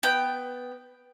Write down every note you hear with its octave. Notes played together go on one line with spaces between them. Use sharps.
B3 G5